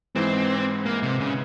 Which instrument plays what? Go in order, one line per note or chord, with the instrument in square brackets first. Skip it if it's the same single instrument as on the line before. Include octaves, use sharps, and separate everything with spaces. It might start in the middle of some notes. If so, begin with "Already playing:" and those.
[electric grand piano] G#2 E3 G#3 [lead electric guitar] C4
[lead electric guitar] A#3
C3
C#3